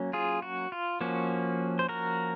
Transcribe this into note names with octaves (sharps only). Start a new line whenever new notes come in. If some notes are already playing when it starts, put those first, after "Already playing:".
Already playing: F#3 A#3 C#4
F4 G#4
F#4
F4
F3 A#3 C#4 F#4
C5
F#4 A#4